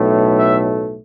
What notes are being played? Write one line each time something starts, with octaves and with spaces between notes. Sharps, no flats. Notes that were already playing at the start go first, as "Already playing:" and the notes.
Already playing: B1 A2 A3
E5